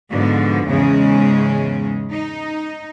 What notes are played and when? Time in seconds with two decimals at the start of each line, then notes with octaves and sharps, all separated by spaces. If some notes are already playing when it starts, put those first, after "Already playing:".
0.12 G#2 B2 D3 F3
0.66 E2 G#2 C#3 G#3 C#4
2.11 D#4